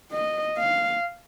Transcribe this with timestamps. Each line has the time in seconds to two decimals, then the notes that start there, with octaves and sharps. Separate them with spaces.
0.12 D#5
0.58 F5